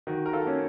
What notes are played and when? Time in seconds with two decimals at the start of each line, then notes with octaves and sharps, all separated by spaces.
0.07 D#3 F#4
0.26 A#4
0.33 F4 A4
0.46 A#3 C#4